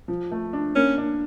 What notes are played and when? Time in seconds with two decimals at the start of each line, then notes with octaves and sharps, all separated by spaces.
0.08 F3
0.31 A3
0.53 D4
0.75 A#3 C#4
0.98 D4